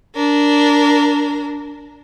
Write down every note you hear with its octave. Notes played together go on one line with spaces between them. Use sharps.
D4 A#4